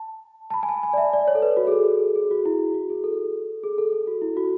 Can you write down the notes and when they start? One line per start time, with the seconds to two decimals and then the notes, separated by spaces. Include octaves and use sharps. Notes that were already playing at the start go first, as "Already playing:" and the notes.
Already playing: A5
0.50 A5
0.54 B5
0.63 G#5
0.69 A5
0.83 G#5
0.93 D5
0.97 E5
1.13 D5
1.28 C#5
1.35 A4
1.42 B4
1.57 F#4
1.67 G#4
1.72 A4
2.15 G#4
2.31 F#4
2.46 E4
2.74 F#4
2.90 G#4
3.04 A4
3.64 G#4
3.78 A4
3.93 A4
4.07 F#4
4.22 E4
4.37 F#4